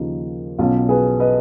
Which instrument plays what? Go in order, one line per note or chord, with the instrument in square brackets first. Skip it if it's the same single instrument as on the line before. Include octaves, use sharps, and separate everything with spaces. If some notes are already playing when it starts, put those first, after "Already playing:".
Already playing: [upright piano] D#2 C#3 F3 D#4
B1 B2 F#3 C#4 F4
G#4 B4
B4 D#5